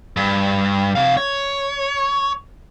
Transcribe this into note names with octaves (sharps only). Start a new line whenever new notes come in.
G2
C3 F5
C#5